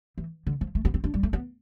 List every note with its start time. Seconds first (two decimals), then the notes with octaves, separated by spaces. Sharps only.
0.18 E3
0.47 D3
0.61 F3
0.75 A3
0.85 B3
0.94 C4
1.04 D4
1.14 G3
1.23 A3
1.33 B3